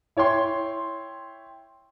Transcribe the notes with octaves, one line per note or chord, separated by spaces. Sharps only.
E4 C#5 G5 C6